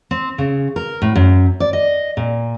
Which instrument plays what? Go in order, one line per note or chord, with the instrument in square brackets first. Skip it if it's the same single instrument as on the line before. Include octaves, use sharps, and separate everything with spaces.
[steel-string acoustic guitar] C4
C#3
A#4
A2
F#2
D5
D#5
A#2